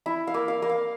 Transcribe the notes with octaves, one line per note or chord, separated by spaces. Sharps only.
E4 E5
F5
A#3
F5
A#3
F5